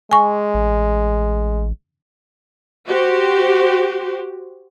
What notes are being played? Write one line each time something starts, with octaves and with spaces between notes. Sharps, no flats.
G#3 G#5 C#6
A1
F#4 G4 C5